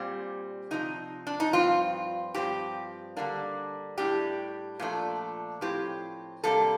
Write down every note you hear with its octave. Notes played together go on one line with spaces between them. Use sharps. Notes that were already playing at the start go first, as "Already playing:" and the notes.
Already playing: A#2 G3 C4
C3 F3 C4 D#4
D4
D#4
G2 F3 C4 F4
G2 F3 C4 G4
D3 G3 A#3 D4
A2 G3 D4 G4
A#2 F3 A3 D4
A2 F3 C4 G4
C3 G3 A#3 D4 A4